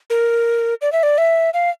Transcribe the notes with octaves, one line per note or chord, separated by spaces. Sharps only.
A#4
D5
E5
D5
E5
F5